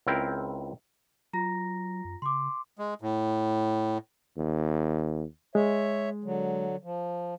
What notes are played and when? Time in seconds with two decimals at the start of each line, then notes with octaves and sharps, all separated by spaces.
0.07 C#2 C4 E4 A#4 G5
1.33 F#3 F4 A#5 A#6
2.05 F#2
2.22 C#3 C6 D6
2.79 G#3
3.02 A2
4.37 D#2
5.55 G#3 C#5 E5
6.24 D3 F#3
6.83 F3